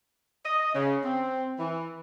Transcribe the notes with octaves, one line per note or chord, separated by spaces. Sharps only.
D#5
C#3
C4
E3